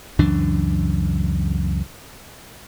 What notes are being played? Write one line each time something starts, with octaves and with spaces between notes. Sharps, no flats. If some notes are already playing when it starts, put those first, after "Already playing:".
C#2 F#2 E3 D4